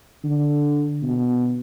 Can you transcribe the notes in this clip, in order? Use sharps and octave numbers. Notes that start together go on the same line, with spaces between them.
D3
B2